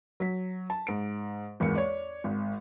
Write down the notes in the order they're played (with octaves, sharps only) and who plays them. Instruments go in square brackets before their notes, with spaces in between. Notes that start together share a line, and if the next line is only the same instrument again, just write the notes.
[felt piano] F#3 B6
A5
G#2 D7
G#1 E2 A#3 C#7
C#5 D5
G#1